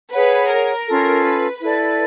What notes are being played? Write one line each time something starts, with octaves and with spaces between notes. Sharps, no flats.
G#4 B4 C#5 F#5
A#4
C#4 F4 A4
B4
E4 A4 B4 D5